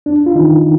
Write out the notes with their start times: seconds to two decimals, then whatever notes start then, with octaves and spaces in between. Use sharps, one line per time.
0.06 F2 D4
0.26 F4
0.35 D#3 D#4